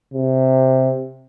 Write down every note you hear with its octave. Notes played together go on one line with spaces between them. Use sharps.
C3